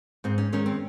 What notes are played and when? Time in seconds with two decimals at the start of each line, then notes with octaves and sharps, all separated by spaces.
0.24 G#2 C4
0.38 C#4
0.53 D#3 G#3 C#4
0.66 C4